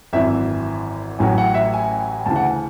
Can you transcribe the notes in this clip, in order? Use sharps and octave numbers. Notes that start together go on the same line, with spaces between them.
G#1 F#2 E3 E5
A1 A2 F#3 C#4 G#5
F#5
E5
G#5
D2 C#3 E3 A5
F#5
G#5